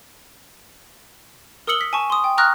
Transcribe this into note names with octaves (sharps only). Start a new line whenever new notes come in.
A#4 D#6 E6 C#7 F#7 G7
B6
G#5 A5 C#6
C6 D#6
G5
A#5 C#6 D#6 F6 F#6 A#6